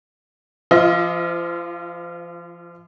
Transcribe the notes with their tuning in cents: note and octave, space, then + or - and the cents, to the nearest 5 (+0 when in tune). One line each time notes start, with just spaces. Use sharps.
F3 -35 F4 +0 D#5 +35